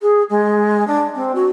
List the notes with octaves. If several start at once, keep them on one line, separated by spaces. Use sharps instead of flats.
G#4
G#3
D4
C4
F#4